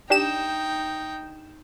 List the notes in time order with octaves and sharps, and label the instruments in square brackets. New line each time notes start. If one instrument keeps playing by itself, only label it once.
[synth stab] D4 G4 E7 [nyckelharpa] D#4 G5